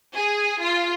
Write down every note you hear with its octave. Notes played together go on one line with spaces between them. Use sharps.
G#4
F4